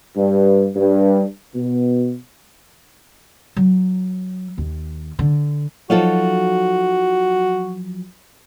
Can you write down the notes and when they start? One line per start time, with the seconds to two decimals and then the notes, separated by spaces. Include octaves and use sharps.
0.15 G2
0.75 G2
1.55 B2
3.57 F#3
4.58 D#2
5.19 D3
5.90 F3 F#3 D#4 F4 F#4 A4